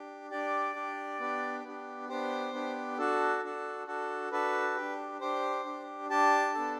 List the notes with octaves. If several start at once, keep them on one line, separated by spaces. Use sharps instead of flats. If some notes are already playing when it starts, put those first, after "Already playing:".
Already playing: D4 G4
D4 G4 D5
D4 G4
B3 D4 G4
B3 D4 G4
B3 D4 G4 C5
B3 D4 G4
D4 F#4 A4
D4 F#4 A4
D4 F#4 A4
D4 F#4 A4 B4
D4 G4
D4 G4 C5
D4 G4
D4 G4 A5
B3 D4 A4